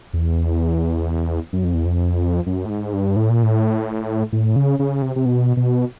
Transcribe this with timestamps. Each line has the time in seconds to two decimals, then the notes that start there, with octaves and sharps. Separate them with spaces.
0.13 E2
1.53 F#2
1.64 F2
1.74 E2
1.86 F2
2.46 F#2
2.65 A2
2.70 G#2
2.93 G2
3.16 A2
3.30 A#2
3.43 A2
4.32 A2
4.56 C#3
4.79 C#3
5.02 C3
5.16 C3
5.25 B2
5.57 B2